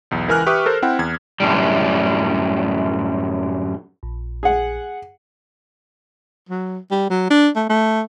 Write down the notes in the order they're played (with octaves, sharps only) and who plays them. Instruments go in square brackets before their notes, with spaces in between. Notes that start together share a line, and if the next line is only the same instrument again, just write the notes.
[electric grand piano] B1 E2
C#2 E3 A#4 G#5 F6 F#6
G4 B4 E5 C#6 D#6
A4 A#4 C5
C4 E4 F#5 G5
E2 G#6
[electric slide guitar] F#2 A2 D3 G3
[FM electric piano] A#1
[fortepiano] G#4 F#5
[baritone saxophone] F#3
G3
F#3
D4
A3
A3